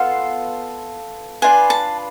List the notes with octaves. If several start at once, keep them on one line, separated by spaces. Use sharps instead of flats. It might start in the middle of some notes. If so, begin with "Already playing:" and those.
Already playing: B3 F4 A4 F5 F#5
D4 F4 B4 G#5
A5